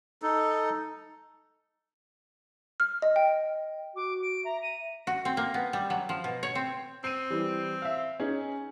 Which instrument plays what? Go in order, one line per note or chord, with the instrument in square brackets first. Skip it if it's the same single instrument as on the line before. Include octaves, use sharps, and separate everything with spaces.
[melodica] D#4 A4
[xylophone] F6
D#5
G5
[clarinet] F#4 [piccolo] D6
[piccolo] D7
[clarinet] E5 [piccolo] A#5
[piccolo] D#7
[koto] F#4
C4
A#3
B3
G3
F#3
F3
B2
C#5
C4
[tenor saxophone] C4 [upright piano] C7 D#7
[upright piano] E3 G3
E5 F5
C#4 D#4 G#4